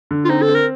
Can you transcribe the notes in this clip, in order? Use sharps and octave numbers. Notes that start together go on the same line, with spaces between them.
D3
F4
C4 D#4
A4
C4
A#4